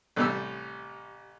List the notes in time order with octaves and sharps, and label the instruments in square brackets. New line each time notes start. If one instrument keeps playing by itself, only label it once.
[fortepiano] A1 A2 C3 G3 E6